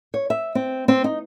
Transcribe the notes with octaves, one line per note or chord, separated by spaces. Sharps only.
C#5
E5
C4
C4
D#4